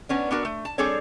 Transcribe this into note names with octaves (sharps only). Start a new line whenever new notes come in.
B3 C#4 D4
B3 D4 F#4 A#4
A3
A5
G3 C4 D4 G#4 A4 C#5